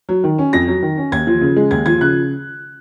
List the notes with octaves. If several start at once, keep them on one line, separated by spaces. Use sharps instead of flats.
F#3
D#3
C#4
F2 A#6
F#3
D#3
C#4
D#2 G#6
F3
C#3
G#3
D#2 G#6
F3 G#6
C#3 F#6